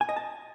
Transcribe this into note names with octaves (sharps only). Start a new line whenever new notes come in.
G#5
D#5
A5